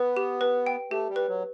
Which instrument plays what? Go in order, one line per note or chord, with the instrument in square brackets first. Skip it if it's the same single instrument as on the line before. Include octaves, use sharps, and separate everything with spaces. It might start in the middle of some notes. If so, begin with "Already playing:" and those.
Already playing: [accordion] B3 [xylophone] B4
[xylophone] G4
B4
G5
[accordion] A3 [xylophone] G4
[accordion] G3
[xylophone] B4
[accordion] F#3